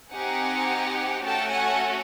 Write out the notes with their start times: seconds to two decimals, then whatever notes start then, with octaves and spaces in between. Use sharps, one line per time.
0.11 C4 D#4 G4 F#5 G#5
1.23 A3 C#4 F#4 A4 G5 A5
1.51 F#5 G#5